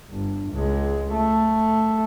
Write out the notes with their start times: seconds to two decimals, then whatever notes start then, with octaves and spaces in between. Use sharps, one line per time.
0.10 G1
0.52 C#2 G#3
1.12 A3